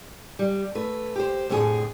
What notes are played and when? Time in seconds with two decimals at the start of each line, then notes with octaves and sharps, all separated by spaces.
0.39 G3
0.75 A3 B4
1.16 G4 C5
1.49 F2 A2 D3 F#4 G#4